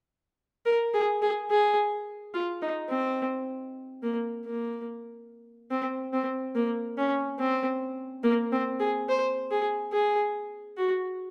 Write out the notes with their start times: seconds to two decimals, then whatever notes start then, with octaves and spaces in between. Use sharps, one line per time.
0.66 A#4
0.94 G#4
1.22 G#4
1.51 G#4
2.34 F4
2.62 D#4
2.90 C4
4.02 A#3
4.46 A#3
5.71 C4
6.13 C4
6.55 A#3
6.98 C#4
7.39 C4
8.24 A#3
8.52 C4
8.80 G#4
9.09 C5
9.51 G#4
9.93 G#4
10.77 F#4